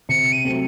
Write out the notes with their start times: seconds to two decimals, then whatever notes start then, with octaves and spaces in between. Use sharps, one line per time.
0.09 C3 C#7
0.33 D#7
0.45 F#3 A3 C4